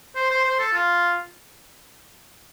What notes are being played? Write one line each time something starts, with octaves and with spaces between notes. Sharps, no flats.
C5
C5
C5
A4
F4